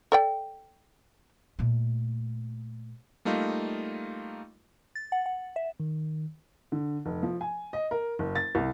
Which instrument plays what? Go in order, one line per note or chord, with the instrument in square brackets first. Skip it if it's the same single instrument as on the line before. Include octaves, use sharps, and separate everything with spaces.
[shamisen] A4 D5 G5
[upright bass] A#2 A3
[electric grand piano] G3 A3 A#3 D#4 F4
[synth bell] A6
F#5
F#5
E5
[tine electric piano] D#3
[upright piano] D3
F1
F3
G#5
D#5
A#4
F#1
A6
C2